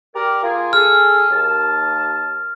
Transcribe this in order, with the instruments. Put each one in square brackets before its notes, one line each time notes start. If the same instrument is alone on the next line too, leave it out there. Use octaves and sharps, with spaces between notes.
[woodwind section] G4 A#4 D5
A#3 F4 G#4
[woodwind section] G#4 A4 [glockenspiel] F6
[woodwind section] D#2 A5